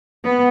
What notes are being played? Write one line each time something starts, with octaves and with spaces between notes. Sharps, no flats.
B3